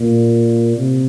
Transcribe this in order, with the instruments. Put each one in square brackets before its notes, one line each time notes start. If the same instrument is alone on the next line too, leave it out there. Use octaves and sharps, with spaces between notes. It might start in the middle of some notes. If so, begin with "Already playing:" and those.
Already playing: [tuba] A#2
C3